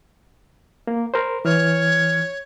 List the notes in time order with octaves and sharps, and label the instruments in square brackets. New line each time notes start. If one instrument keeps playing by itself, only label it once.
[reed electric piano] A#3
A#4 C5
[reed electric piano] E3 F6 [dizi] C#5